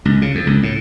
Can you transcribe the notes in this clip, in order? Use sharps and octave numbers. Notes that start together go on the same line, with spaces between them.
C#2
C#3
F2
C#2
A2